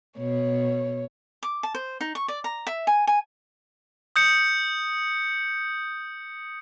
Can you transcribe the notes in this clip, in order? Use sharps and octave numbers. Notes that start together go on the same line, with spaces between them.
B2 C#5
D6
A5
C5
D#4
C#6
D5
A#5
E5
G#5
G#5
D#6 G6 C#7